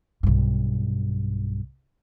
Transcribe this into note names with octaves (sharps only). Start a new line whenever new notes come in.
B1 G2